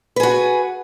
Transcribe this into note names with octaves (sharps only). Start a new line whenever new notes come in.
F#4 G#4 B4